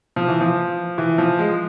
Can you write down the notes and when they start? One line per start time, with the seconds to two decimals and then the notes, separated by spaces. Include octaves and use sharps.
0.16 F3
0.28 E3
0.41 F3
0.98 E3
1.18 F3
1.39 G#3